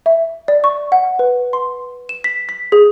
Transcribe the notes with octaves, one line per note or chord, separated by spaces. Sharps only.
E5
D5
C#6
F#5
B4
C6
E7
B6
B6
G#4